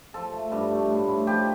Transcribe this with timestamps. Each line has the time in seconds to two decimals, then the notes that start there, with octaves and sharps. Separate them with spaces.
0.14 F3 A4
0.33 A3
0.52 G2
0.72 A3
0.90 A2
1.09 A2
1.27 F3 G4